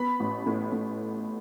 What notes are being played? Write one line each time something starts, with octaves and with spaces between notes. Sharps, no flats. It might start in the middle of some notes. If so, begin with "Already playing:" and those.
Already playing: B3 B5
A1
A2
A2